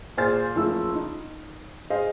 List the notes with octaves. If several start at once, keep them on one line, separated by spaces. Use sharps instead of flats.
A#2 G#4 C5 G#5 F6 A6
F#1 F3 A3 E6
D#4
G#4 C5 D#5 F5